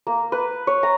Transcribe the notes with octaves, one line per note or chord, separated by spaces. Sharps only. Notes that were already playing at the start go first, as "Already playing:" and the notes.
A#3
B4
C#5
A#5